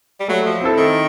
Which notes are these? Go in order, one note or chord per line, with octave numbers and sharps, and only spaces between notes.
G3
F#3 A3
F3
C4 E4 A4
D#3